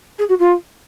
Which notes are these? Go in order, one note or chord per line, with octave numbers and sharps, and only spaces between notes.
G#4
F#4
F4